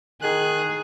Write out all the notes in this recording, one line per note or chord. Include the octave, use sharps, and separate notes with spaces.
D#3 G#4 F#6